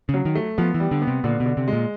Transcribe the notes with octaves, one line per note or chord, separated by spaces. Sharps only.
C#3
F#3
D#3
A3
F3 B3
E3
G3
D3
B3
C3
A#2 D3
B2
D3
C3
G#3
A#2